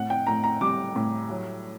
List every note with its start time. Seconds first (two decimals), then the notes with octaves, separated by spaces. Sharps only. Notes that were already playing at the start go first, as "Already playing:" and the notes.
Already playing: A2 F#5
0.10 G5
0.27 A2 A#5
0.44 A#5
0.61 G3 D6
0.96 A2
1.30 F#3